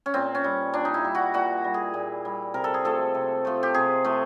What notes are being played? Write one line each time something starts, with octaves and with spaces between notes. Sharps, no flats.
C#4
A#2 C4
C#4
G3
A#2 D4
D#4
E4
G3
F#4
A#2 F#4
G3
G#4
A#2
G3
C3 A#4
A4
G#4
F3 A3 A4
C3
F3 A3
G4
C3 G#4
F3 A3